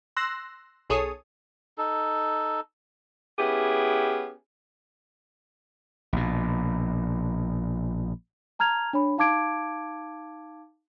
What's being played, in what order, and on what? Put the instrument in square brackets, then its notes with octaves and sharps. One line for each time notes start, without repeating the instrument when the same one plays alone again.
[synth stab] C6 E6 F#6 A#6
B1 G#4 A4 C#5 D#6
[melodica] D#4 A4
[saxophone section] B3 C#4 E4 G4 G#4
[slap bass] A#1 B2
[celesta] A5 A#5 F6 G#6 F7
D4 C#5 B5
D#4 F5 A5 D6 G#6 D7